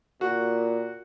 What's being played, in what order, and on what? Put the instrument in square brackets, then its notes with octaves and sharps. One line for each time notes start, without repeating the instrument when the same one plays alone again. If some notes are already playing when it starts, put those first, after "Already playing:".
[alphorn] A#2 [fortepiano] F#4